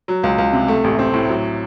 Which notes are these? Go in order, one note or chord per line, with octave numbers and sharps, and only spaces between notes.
F#3
C#2
C#2
C3
A3
A1
C4
A2
F#3